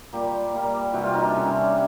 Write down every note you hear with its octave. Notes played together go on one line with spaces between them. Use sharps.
A#2 G3 A#3 G4
A#2 G3 A#3
C3 E3 G3 F#4
F4
D#4
D4
C3 E3 G3 C#4